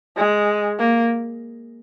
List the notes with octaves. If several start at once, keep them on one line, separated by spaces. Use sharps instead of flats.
G#3
A#3